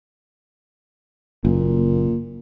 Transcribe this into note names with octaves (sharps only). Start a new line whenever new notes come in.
F#1 A#2 A#3